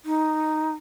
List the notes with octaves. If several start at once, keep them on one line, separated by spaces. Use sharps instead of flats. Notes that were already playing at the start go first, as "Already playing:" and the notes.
D#4